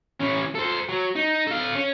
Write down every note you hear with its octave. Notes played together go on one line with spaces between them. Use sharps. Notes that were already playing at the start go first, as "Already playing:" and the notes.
E3 C#4
A4 C5
F#3
D#4
A4 F5
C#4